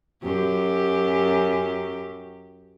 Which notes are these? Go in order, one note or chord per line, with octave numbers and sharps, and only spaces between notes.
F#2 G4